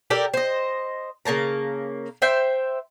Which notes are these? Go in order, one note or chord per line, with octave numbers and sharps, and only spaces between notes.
G4 A4 A#4 D5
C5 D#5
C#3 A#3 A5 A#5
C5 E5 G5